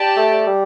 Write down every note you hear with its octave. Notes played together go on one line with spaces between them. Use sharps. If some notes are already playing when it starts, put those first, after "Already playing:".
Already playing: G4 D5 A5
A3
G3